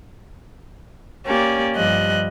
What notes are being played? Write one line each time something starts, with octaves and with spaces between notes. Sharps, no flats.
A#3 C#4 G4 A#4 D5
G2 F3 G3 D#5 F#6